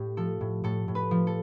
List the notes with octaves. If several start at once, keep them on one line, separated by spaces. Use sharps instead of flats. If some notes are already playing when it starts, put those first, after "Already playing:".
Already playing: A2 G4 D5
F3 A4
A2
A2 A4
A2
B4
F3
A4